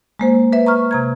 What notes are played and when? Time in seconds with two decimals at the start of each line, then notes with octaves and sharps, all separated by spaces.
0.19 G#3 A#3 C5
0.53 B4 E5
0.66 A#5 C#6 F6
0.91 C3 A#5 G#6